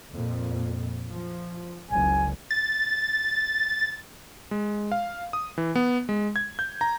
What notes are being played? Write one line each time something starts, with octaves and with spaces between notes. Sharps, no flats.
F2 A#2
F3
F#1 C#2 C#3 G#5
A6
G#3
F5
D#6
E3
B3
G#3
G#6
G6
A#5